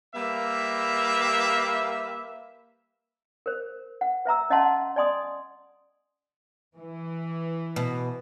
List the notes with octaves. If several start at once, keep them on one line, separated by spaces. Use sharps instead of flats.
G3 A#3 B4 E5
A#4 C5
F#5
B4 E5 A#5 E6
C#4 D#5 E5 F#5 A5 C6
F#5
D5 D#5 G#5 C6 D#6
E3
B2